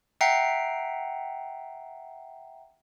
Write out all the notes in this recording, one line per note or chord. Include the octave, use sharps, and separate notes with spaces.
E5 F#5 G5 A#5 C7